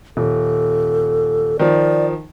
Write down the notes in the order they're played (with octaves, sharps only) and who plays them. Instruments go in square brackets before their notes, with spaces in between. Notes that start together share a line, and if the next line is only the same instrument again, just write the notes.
[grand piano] D#1 [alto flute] A4
[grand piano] D#3 F3 [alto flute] D5